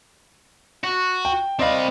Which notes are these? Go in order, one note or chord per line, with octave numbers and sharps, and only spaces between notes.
F#4
G5
C4 D5 D#5 F5 B5